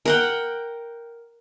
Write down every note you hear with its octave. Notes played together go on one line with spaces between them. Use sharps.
A#4 F#5 G5